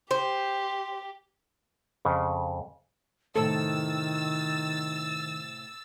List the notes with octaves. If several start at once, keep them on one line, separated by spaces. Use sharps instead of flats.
G4 C5
F2 C#3
A2 C3 D#3 G#4 A4 E6 A6